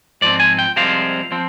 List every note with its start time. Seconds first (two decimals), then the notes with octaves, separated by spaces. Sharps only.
0.21 G#2 F3 C4 D5
0.40 G#5
0.59 G5
0.76 C2 C3 F3 G#3 C4 F5
1.32 F3 C4